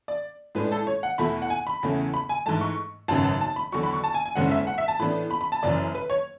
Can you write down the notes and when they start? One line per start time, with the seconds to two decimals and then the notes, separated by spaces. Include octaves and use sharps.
0.08 D5
0.55 A2 G#3 D4 B4
0.72 A4
0.87 C#5
1.03 F#5
1.18 E2 B2 A3 E4 B5
1.42 F#5
1.50 G#5
1.67 B5
1.83 E2 C#3 E3 A3
2.14 B5
2.29 G#5
2.46 G#2 E3 A3 A5
2.61 C#6
3.08 G#1 F#2 C#3 F#3 B3 A5
3.24 A5
3.41 A5
3.56 B5
3.72 E2 D3 F#3 C#6
3.83 B5
3.93 C#6
4.04 A5
4.14 G#5
4.26 G#5
4.35 F#1 E2 D3 G#3 C#4 F#5
4.51 E5
4.67 F#5
4.78 E5
4.88 A5
4.99 A2 E3 B3 D4 B5
5.31 B5
5.41 B5
5.52 A5
5.63 F#1 F#2 E3 D5
5.95 B4
6.10 C#5